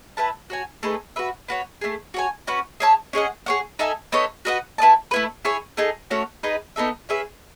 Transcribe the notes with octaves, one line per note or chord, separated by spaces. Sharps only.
E4 B4 E5 A5
F#4 C#5 G#5
A3 D#4 G#4 B4
F#4 B4 E5
B3 F#4 C#5
A3 D#4 G#4
F#4 C#5 G#5
C#4 F#4 B4 F#5
G#4 C#5 E5 A5
C#4 G#4 D#5 F#5
G#4 C#5 F#5
D#4 A4 E5 G#5
B3 D#4 A4 C#5
F#4 B4 D#5 F#5
E4 B4 D#5 A5
A3 E4 B4
E4 G#4 C#5 G#5
A3 D#4 G#4
A3 C#4 F#4 C#5
D#4 G#4 B4 D#5
B3 D#4 A4 E5
C#4 G#4 B4 E5